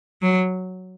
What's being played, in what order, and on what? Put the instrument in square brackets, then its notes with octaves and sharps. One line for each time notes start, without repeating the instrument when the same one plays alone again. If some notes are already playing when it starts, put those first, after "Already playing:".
[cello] F#3